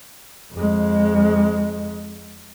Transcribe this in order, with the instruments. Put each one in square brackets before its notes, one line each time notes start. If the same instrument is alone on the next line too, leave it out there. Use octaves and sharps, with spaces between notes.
[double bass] F2 G#3